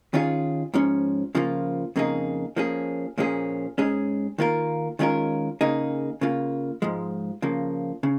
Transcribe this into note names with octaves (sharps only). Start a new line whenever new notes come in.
D#3 C#4 F4 G#4
G#2 F3 C#4
C#3 F3 A#3 F4
F2 C#3 A#3 D#4 G#4
F3 A#3 C#4 G#4
A#2 F3 A#3 C#4 G#4
G#2 G#3 C#4 G#4
D#3 A#3 F4 A#4
D#3 G#3 C#4 F4 A#4
C#3 A#3 D#4 G#4
C#3 A#3 F4
G#2 F3 G#3
C#3 F3 A#3
C#3